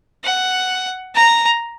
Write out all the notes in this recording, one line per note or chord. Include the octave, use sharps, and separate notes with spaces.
F#5
A#5